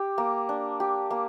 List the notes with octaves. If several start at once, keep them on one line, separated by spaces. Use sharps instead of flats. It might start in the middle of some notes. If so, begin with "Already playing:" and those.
Already playing: G4
A#3
D4
G4
A#3